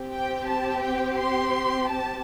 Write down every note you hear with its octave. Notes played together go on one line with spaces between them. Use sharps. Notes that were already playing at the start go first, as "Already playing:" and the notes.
Already playing: C4 G4
G5
A5
G5
C6
A5